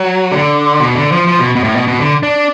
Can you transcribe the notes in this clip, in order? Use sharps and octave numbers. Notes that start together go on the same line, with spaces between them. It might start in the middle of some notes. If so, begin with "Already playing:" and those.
Already playing: F#3
D3
B2
D3
F3
F3
B2
B2
A2
B2
B2
D3
D4